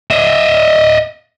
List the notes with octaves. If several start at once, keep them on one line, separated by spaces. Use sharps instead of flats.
D#5 E5